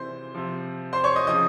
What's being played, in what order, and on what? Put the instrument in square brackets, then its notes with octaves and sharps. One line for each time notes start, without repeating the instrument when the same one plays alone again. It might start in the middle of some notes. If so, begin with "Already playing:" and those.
Already playing: [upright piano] C3 E3 C5 C6
C3 F3
C5 C6
C#5 C#6
D#5 D#6
C#3 F3 D#5 D#6